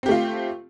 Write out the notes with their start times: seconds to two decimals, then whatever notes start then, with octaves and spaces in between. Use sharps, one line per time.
0.03 C4
0.06 G4
0.09 A3
0.11 F4